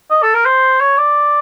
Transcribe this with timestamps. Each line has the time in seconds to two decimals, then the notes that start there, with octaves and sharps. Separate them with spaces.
0.10 D#5
0.22 A4
0.34 A#4
0.45 C5
0.80 C#5
0.98 D5